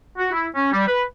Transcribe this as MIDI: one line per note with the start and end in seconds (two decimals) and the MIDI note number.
0.18 0.31 66
0.32 0.47 64
0.55 0.70 61
0.73 0.86 55
0.88 1.03 71